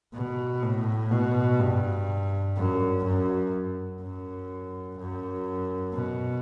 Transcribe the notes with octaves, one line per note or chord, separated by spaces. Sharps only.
B2
A2
B2
G2
F#2
F#2
F#2
F#2
B2